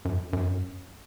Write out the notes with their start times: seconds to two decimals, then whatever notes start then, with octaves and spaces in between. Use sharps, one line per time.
0.05 F#2
0.33 F#2